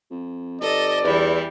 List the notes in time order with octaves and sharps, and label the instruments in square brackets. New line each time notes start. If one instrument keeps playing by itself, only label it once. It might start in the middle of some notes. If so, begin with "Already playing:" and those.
[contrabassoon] F2
[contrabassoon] G1 [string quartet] A4 D#5 [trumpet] D5
[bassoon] E2 [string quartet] E3 G3 E4